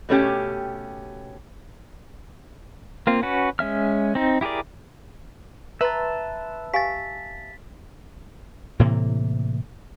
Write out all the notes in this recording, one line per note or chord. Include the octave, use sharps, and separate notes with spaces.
B2 A3 C#4 G4
A#3 C4 F4
C#4 F#4 B4
G#3 C#4 E5 F6
C4 D#4
E4 G4 G#4 A#4 D5
B4 E5 A5 A#5 C6
G4 F5 G#5 A6 B6
A2 C3 E3 A#3